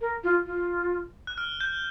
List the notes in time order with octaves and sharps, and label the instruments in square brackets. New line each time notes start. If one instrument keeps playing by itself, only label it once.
[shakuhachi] A#4
F4
F4
[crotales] F#6
F6
G6